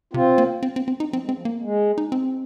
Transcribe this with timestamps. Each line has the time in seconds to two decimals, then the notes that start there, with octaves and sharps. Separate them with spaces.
0.13 C3 C4 F4
0.38 A#3
0.63 C4
0.76 C4
0.88 C4
1.00 D#4
1.12 F3 C4
1.25 G#3
1.29 C4
1.37 F3
1.45 A#3
1.62 G#3
1.98 D#4
2.12 C4